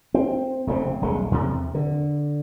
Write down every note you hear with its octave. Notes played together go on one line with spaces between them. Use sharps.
C4
F1 C#3 A3 C4
D#1 B1 G#3 A3
E2 C3
D3